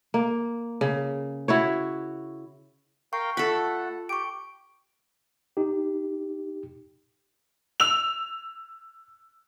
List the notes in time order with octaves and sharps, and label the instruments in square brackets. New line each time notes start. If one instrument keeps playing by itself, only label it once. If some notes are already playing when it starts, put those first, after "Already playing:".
[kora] A#3
C#3
E4 F#4 C#5
[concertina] A#4 F5 G5 [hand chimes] C#6
[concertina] A3 F#5 [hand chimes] F4 [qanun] A4 B5
[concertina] G4 [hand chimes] C#6 D7
[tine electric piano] D#4 G4
[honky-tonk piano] E6 F7